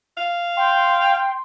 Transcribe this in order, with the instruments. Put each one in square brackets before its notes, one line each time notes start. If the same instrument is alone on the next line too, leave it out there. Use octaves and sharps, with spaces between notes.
[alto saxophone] F5
[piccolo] G5 [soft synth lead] C6